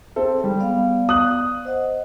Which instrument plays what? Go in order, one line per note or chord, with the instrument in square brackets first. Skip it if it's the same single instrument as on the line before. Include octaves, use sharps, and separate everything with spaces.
[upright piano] C4 A4 [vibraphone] G#4
[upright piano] G3
[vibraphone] B3 D5 F5
[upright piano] D#6 F#6 F#7
[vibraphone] C5 D#5 F#5